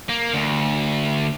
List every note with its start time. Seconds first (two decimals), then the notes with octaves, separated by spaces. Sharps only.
0.09 A#3
0.34 D2